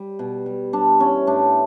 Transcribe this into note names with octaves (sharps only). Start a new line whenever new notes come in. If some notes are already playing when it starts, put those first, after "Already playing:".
Already playing: G3
B2
G3
G3 D4
E3 C#4
A2 D4